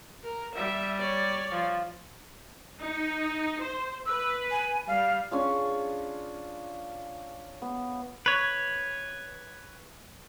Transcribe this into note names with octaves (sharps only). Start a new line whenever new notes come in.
A#4
G3 E5
C#5 D5
F3
D#4
C5
B4 E6
G#5
G3 F5
C#4 D4 F4 G#4
B3
B4 C#5